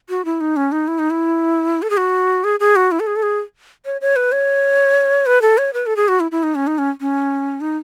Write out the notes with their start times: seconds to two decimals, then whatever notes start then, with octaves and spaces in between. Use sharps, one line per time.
0.09 F#4
0.25 E4
0.41 D#4
0.56 C#4
0.72 D#4
0.88 E4
0.99 D#4
1.10 E4
1.82 A4
1.90 G#4
1.97 F#4
2.44 G#4
2.60 G#4
2.76 F#4
2.92 E4
3.00 A4
3.07 G#4
3.16 A4
3.23 G#4
3.85 C#5
4.01 C#5
4.16 B4
4.32 C#5
5.26 B4
5.42 A4
5.58 C#5
5.73 B4
5.86 A4
5.96 G#4
6.08 F#4
6.20 E4
6.31 E4
6.43 D#4
6.55 C#4
6.67 D#4
6.78 C#4
7.01 C#4
7.61 D#4